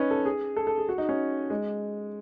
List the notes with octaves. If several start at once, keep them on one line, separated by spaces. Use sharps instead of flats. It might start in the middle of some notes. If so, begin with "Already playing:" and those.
Already playing: C#4 D#4 B4
A4
G#4
A4
A4
G#4
F#4
D#4
C#4
G#3